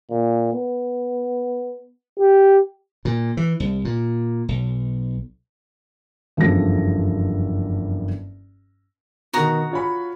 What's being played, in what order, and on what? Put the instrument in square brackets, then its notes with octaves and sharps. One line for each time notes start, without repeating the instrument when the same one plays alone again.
[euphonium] A#2
B3
G4
[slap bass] A#2
E3
C2
A#2
B1
[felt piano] F#1 E2 G2 F3 A4 A#6
[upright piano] B2 D#3 [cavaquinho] F#4 A#5 D#6
[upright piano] F4 C#5 B5